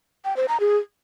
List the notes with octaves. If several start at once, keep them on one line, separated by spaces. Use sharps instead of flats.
G5
C5
A#5
G#4